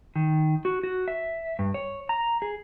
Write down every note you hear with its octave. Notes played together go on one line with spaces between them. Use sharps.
D#3
F#4
F#4
E5
G2
C#5
A#5
G#4